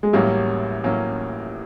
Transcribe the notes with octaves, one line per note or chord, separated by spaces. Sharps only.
G#3
A1 A2 F#3 G3 A#3 C#4
A1 A2 F#3 A#3 C#4